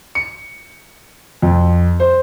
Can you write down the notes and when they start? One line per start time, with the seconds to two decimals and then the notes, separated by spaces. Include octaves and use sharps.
0.15 C#7
1.42 F2
2.00 C5